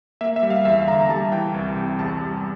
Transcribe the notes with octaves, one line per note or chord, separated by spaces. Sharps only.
A#3 E5
E5
G3
F5
E2 E5
D3 A#5
G3 A5
E3 G5
C2
C3
E2 A5
G3